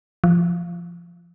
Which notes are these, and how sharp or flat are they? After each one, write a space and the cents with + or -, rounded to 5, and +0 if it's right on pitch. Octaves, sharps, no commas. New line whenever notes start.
F3 -15